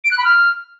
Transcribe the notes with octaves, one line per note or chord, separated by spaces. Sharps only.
D7
F#6
B5
F6